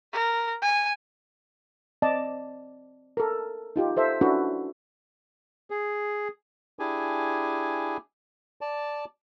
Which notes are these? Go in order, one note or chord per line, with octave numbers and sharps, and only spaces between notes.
A#4
G#5
C4 D5 D#5 A5
A4 A#4
D#4 F4 G4
A4 C5 E5
C#4 D4 E4 F#4 A4 B4
G#4
D4 E4 G4 G#4 G#5
D5 A5